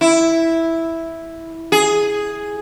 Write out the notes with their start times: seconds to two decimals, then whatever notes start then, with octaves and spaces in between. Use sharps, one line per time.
0.01 E4
1.72 G#4